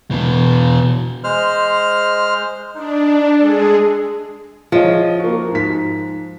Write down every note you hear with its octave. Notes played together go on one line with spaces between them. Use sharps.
B2 E3
G#3 C5 F6
D4 D#4
G#3 G#4 A4
F3 G#4 C#5 D#5
A#3 F#4
G#2 B6